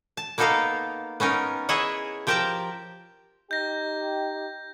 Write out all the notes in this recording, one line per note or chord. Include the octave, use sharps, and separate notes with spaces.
A5
A#3 B3 D#4 A4 A#4 F5
B3 C#4 D#4 A#4
E4 G#4 C#5 D#5 E5 F#5
F3 G4 A#4 G5 A5 A#5
D#4 G4 G6 A#6